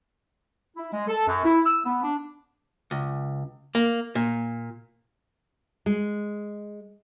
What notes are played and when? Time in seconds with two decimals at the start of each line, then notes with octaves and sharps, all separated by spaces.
0.76 E4
0.92 G#3
1.08 A4
1.27 F#2
1.44 E4
1.65 E6
1.84 B3
2.02 D4
2.91 C#2
3.75 A#3
4.15 A#2
5.86 G#3